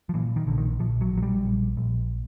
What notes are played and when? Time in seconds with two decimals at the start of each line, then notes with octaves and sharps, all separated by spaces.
0.09 F3
0.14 A#2 E3
0.36 D#3
0.46 A#1 D3
0.58 D#3
0.80 A#1 F3
1.01 F#3
1.12 A#1
1.17 F#3
1.22 G3
1.44 A#1
1.77 A#1